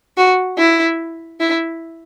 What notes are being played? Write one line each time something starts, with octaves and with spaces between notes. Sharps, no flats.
F#4
E4
E4